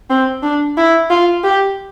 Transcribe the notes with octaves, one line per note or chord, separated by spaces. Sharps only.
C4
D4
E4
F4
G4